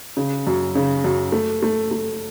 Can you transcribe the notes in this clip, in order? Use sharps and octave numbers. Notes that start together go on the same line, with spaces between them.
C#3
F#2
C#3
F#2
A3
A3
A3